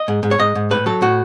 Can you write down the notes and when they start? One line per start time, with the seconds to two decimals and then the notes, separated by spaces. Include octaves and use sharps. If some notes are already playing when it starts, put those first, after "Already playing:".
Already playing: D#5
0.08 G#2
0.23 G#2
0.31 C#5
0.39 G#2 D#5
0.55 G#2
0.71 A2 B4
0.86 F#3 A4
1.02 A2 F#4